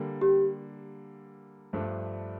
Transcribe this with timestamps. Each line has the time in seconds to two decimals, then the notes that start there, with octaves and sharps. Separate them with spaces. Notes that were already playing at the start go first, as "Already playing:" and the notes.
Already playing: D3 G3 A#3
0.21 G4
1.73 G2 F3 A3 D4